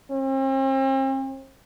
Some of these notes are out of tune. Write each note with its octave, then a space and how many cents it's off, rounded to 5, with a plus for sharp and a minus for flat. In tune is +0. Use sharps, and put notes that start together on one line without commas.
C4 +40